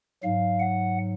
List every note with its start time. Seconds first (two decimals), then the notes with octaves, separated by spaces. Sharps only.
0.23 G#2 F#3 F5
0.60 F#5